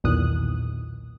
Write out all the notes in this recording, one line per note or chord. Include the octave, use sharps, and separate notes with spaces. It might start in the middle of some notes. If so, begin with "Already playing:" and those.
B1 E2 A#2 D#3 D#6 F#6